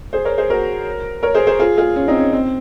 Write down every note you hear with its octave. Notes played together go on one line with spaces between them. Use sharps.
G#4 C5
A#4 C#5
G#4 C5
F#4 A#4
A#4 C#5
G#4 C5
G#4 C5
F4 G#4
F4 G#4
C#4 F4
C4 D#4
C#4
C4